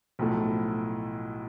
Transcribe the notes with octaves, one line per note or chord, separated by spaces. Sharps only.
B1 A2 F3 A3